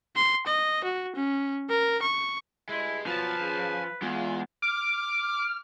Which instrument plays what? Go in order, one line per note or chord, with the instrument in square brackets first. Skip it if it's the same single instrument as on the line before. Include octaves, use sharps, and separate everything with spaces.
[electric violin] C6
D#5
F#4
C#4
A#4
C#6
[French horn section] D2 G2 D#5 [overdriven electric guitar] G#3 [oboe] E4
[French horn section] B2 F#3 [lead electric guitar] F3 [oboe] B4 [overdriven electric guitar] G#5 A5
[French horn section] C#4 G#4
[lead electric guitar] E2 [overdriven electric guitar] G#3 [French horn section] F4
[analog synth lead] D6 [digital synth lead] F6